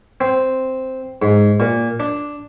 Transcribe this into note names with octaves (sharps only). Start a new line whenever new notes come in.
C4
G#2
A#2
D4